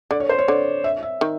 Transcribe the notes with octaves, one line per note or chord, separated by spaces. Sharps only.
D3 D5
C#5
C5
C#5
D3 D5
E5
E5
D#3